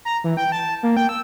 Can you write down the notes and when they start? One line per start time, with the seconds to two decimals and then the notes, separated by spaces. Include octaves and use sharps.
0.05 A#5
0.24 E3
0.37 G5
0.52 A5
0.83 A#3
0.97 G5
1.09 E6